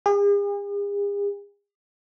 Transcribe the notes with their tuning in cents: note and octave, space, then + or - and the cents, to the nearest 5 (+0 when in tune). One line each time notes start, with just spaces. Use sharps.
G#4 -45